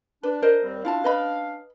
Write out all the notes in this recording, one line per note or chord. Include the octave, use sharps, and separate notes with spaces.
D4 B4
A#4 C5 D#5
D#2 G3 C4
C#4 D4 E4 F4 F5 A5
B4 D#5 B5